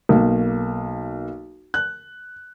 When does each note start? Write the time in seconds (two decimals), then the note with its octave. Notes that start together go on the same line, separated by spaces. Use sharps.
0.09 B1 A#3
1.74 F#6